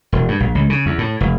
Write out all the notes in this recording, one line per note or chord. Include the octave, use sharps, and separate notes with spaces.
E1
G2
A#1
C#2
C#3
E2
A2
F1